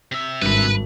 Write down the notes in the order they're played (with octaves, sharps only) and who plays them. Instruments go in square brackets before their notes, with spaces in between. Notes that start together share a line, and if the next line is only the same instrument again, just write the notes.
[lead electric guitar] C3 E5
[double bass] G#1 [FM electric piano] G2 [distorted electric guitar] B4 B5